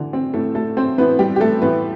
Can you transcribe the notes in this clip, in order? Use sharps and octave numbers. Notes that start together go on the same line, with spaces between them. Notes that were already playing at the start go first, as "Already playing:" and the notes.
Already playing: A2 D3 E3 D4
C4
A2 E3 A3 A4
A3 A4
C4 C5
A2 E3 B3 B4
G3 G4
G4
A3 A4
A2 E3 B3 B4